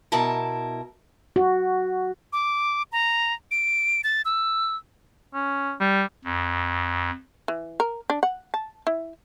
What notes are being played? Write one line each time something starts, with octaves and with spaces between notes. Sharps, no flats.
B2 E4 A#4 A5
F#4
D6
A#5
D7
A6
E6
C#4
G3
F2
E3
A#4
D4
F#5
A5
E4